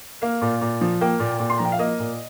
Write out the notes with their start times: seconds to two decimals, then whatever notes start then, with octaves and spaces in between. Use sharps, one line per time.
0.22 A#3 F5
0.42 A#2
0.61 A#2
0.81 F3
1.01 A#3 G5
1.20 A#2
1.40 A#2
1.50 C6
1.58 F3 A#5
1.65 G5
1.72 F5
1.79 A#3 D#5
1.99 A#2